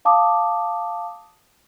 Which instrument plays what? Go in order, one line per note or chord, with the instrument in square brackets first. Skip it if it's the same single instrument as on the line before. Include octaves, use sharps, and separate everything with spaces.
[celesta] F5 A5 D6 D#6